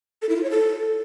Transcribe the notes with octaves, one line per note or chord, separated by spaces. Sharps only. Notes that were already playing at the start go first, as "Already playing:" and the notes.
A4
E4
F4
C#5
A4